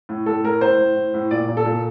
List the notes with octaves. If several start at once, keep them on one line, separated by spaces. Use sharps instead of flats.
A2
A2 A4
A2 A#4
A2 C5
A2
A2
A2
A#2 D5
A#2
A4
A#2